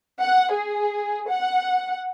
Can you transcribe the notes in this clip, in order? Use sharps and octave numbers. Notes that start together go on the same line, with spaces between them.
F#5
G#4
F#5